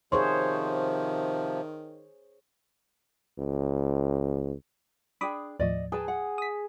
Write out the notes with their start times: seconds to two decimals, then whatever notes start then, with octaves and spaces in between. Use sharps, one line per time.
0.12 C3 D#3 F3 G#4 C5 C#5 C6 C#6
3.38 C#2
5.21 D4 G#4 G5 B5 D6 D#6
5.60 D#2 A2 F3 D5 D#5
5.92 G#4 B4 G5 A5
6.08 F#5
6.38 D#6 B6